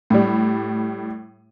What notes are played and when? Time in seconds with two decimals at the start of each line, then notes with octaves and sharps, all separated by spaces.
0.10 A2 G3